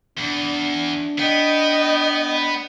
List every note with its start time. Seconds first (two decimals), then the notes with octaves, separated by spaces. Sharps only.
0.18 E2 D4
1.19 B3 D#5 G5